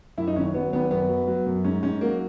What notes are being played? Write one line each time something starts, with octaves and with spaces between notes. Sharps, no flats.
F#2 E4
D#4
G#1 C#4
F#3 B3
G#1 B3
F#2 B3
F#3
F#3
F#2
G#2 C#4
G#2 C#4
F#3 A#3